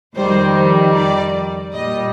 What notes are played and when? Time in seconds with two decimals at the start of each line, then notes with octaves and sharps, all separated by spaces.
0.16 F2 D#3 G3 C5
0.95 D5
1.72 A#2 G3 D#5